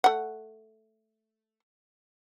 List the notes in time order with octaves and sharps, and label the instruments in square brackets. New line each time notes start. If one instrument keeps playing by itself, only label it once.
[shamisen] A3 F#5